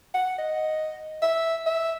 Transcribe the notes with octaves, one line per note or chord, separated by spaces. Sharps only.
F#5
D#5
E5
E5